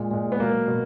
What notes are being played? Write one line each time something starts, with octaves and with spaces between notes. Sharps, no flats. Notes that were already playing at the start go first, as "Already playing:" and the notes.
Already playing: A#2 G#3
A#2 G#3
B3
B2 F#3 A#3
B2